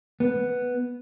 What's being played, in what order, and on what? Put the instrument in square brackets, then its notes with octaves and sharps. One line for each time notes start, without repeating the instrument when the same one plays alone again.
[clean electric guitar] B3